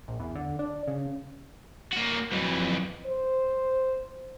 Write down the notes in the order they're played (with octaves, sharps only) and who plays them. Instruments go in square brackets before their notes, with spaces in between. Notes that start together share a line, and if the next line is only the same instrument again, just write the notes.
[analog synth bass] A#1
E2
D3
D4
C#3
[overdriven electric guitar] A#3 F#4
[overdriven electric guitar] F2 E3 [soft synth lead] F#3
[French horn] C5